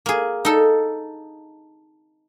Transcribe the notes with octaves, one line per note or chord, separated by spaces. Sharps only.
A#3 G#4
D#4 A4